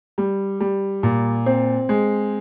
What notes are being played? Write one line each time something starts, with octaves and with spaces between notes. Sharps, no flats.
G3
G3
A#2
C4
G#3